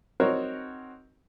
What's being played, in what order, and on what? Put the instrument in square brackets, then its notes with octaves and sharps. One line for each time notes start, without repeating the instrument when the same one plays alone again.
[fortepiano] C4 D#4 F#4 A#4 C5 C#5